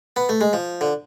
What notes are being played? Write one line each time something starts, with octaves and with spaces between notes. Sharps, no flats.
B3
A3
G#3
F3
D3